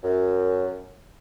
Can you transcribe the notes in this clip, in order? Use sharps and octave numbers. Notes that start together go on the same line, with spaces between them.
F#2